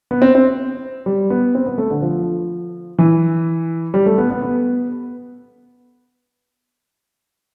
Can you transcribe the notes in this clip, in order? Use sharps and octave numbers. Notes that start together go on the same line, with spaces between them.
B3
C4
C4
G3
B3
C4
B3
A3
D3
F3
E3
G3
A3
B3
B3
B3